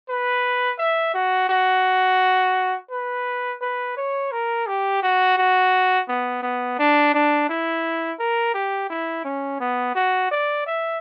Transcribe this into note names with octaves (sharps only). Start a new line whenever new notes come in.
B4
E5
F#4
F#4
B4
B4
C#5
A#4
G4
F#4
F#4
B3
B3
D4
D4
E4
A#4
G4
E4
C#4
B3
F#4
D5
E5